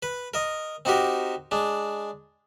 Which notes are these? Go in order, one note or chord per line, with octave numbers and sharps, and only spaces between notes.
B4
A#4 D#5
C4 D#4 F#4 G4 A#4
G#3 D4